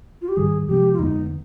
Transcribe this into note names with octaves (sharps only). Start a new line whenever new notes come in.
F4
G4
G#2 D#3 G3 G#4
C3 F3 G#3 B3 G4
F4
F2 D3 G#3 B3 D#4